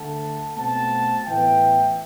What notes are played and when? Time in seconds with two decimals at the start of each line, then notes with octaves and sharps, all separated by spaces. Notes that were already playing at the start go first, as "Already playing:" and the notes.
Already playing: D2 D3 A3 F#5 A5
0.56 B2 A3 C4 F#5 A5
1.25 A2 E3 B3 E5 G5